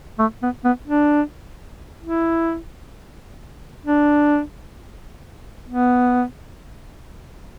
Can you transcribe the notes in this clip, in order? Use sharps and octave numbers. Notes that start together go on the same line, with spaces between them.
A3
B3
B3
D4
E4
D4
B3